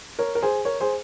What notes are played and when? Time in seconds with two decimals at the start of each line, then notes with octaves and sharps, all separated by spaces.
0.19 A#4 C#5
0.35 A#4
0.42 G#4 C5
0.65 A#4 C#5
0.80 G#4 C5